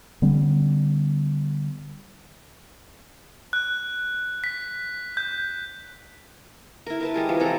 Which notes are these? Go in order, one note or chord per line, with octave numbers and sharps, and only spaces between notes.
D3 G3 B3 C#4
F#6
B6
G6
E4 A#4
A#4 B4 A5
G3 G#3 A#4
E3 F3
C3 A4 A#5